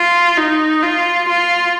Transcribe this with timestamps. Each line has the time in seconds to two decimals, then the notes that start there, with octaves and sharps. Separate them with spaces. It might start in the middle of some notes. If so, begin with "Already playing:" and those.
Already playing: F4
0.37 D#4
0.83 F4
1.28 F4